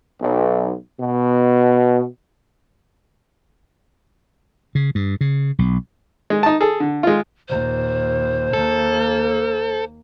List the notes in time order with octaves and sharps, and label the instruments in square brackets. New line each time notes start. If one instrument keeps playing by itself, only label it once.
[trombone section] B1
B2
[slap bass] C#3
G2
C#3
B1
[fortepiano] G#3
D#4 A5
G#4 A4
D3
G#3 F4
[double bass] D#2 A#2 [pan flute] C5
[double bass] D#2 A#3 [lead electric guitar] A4